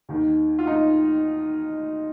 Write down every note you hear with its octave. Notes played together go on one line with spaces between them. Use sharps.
D#2 D#3
F4
D#4